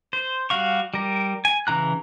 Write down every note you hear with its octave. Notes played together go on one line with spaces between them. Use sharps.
C5
G3 F#4 F5 C#6
G3 A#4
G#5
C#3 E3 A#5 F#6